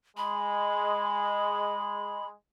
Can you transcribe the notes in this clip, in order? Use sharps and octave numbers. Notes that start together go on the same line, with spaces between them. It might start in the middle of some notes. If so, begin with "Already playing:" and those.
G#3 B5